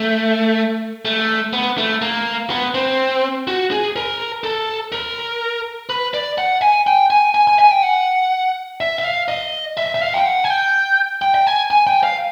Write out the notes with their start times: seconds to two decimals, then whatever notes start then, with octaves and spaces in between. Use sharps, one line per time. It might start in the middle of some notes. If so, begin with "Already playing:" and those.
Already playing: A3
1.05 A3
1.53 B3
1.78 A3
2.02 A#3
2.50 B3
2.75 C4
3.47 F#4
3.71 G#4
3.96 A#4
4.44 A4
4.92 A#4
5.90 B4
6.14 D5
6.38 F#5
6.62 G#5
6.87 G5
7.10 G#5
7.35 G#5
7.47 G#5
7.59 G#5
7.71 G5
7.83 F#5
8.81 E5
8.99 E5
9.04 F5
9.28 D#5
9.77 E5
9.94 E5
10.01 F5
10.14 G5
10.26 F#5
10.44 G#5
10.50 G5
11.22 G5
11.35 G5
11.47 G#5
11.71 G#5
11.87 G5
12.03 F5